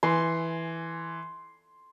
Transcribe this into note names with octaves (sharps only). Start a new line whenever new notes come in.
E3 G#5 C6